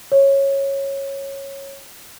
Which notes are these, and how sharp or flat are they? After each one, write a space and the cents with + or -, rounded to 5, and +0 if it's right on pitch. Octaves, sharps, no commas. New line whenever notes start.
C#5 -15